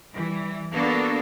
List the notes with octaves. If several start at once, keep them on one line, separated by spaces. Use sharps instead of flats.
E3 G3
A#3 B3 D4 F#4 A4